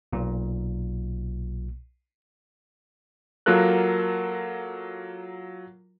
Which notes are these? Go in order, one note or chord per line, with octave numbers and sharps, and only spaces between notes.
B1 A#2
F#3 A#3 F4 A4 A#4 F#6